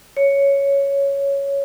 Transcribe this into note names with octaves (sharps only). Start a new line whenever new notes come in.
C#5